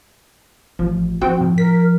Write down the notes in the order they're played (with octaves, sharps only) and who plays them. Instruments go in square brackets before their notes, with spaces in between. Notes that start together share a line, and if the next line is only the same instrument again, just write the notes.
[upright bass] A1 [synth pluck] F3
[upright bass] F3 [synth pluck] C4 F#4 G5
[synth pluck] A2
[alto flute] A#4 [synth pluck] B6